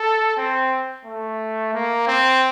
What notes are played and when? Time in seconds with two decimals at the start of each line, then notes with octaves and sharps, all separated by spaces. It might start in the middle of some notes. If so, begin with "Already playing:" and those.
Already playing: A4
0.37 C4
1.05 A3
1.74 A#3
2.07 C4